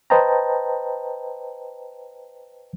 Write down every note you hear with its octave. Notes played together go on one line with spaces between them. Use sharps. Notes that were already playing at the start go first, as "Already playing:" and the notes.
B4 C5 D#5 G5 A5 A#5